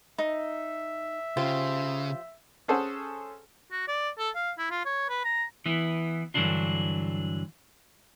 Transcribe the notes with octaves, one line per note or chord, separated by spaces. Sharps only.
D#4 E5
C#3 F4 G4 C5
C#4 G#4 A4 C5 F#5
F#4
D5
A4
F5
E4
F4
C#5
B4
A#5
E3 B3 E4
G2 D3 E3 F#3 D4 F4